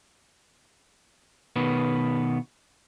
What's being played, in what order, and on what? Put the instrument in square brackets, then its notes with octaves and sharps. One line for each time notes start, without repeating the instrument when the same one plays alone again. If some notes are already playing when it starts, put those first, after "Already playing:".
[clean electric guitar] B2 D#3 B3